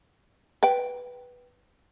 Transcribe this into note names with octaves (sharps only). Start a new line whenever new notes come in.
B4 G5